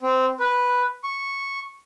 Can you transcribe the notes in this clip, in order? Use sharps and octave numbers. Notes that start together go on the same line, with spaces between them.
C4
B4
C#6